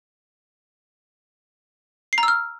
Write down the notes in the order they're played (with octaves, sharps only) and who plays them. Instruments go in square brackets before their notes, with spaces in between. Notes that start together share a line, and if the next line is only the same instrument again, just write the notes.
[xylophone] C7
A#5
E6
F6